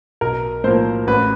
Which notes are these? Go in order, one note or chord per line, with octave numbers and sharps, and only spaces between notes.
B1 A#4
A2 F3 A#3 C5
A1 B4